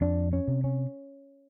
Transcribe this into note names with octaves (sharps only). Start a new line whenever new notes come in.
F2 D4
C#4
C3
C#4